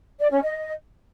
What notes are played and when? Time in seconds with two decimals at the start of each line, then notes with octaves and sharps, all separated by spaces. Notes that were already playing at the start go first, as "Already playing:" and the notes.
0.20 D5
0.31 C#4
0.43 D#5